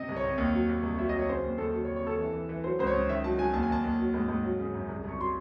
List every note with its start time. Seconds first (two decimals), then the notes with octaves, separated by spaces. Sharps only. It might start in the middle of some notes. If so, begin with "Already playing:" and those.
Already playing: C3 D#5
0.08 C2
0.16 C#5
0.24 C3
0.38 D#2
0.53 F#3
0.69 D#2
0.83 C2
0.98 F#3 E5
1.09 F#3 D#5
1.19 C#5
1.28 C#3 C5
1.44 D#2
1.58 D#2 A4
1.73 F#3
1.85 C#5
1.88 C3
1.96 C#5
2.04 C3 A4
2.18 E3
2.33 E3
2.49 E3
2.64 F#3 C5
2.79 C#2 C5
2.87 C#5
2.94 C#2
3.08 D#3 E5
3.24 F#3 A5
3.38 F#3 G#5
3.53 D#2 A5
3.63 G#5
3.69 D#2 A5
3.84 D#2
3.99 F#3
4.14 G#2
4.29 G#2
4.43 F#3
4.59 C#3
4.74 F#2
4.88 C2
5.04 C2 C#6
5.19 F#3 C6